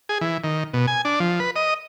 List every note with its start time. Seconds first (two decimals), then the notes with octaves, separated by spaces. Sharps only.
0.09 G#4
0.21 E3
0.44 D#3
0.73 B2
0.87 G#5
1.05 D4
1.20 F3
1.40 B4
1.56 D#5